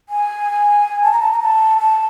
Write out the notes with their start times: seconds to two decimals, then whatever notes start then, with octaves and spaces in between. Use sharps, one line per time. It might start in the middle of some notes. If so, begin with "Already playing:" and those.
0.09 G#5
1.03 A5
1.12 A#5
1.20 A5
1.32 A#5
1.40 A5
1.78 A5